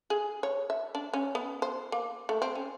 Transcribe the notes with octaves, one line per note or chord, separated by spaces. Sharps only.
G#4
C#5
E5
D4
C#4
B3
C5
A#3
A3
C4
C#4